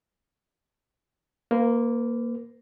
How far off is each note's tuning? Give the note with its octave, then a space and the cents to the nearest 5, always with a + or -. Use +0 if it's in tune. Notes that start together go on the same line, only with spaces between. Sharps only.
A#3 +0 B4 +40